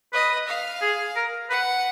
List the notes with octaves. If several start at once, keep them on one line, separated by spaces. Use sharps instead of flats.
B4 D#5
F5
G#4
A#4
B4 F#5